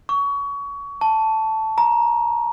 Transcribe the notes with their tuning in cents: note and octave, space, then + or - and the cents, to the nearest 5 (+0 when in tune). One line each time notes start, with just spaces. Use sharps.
C#6 +25
A5 +0
A#5 +20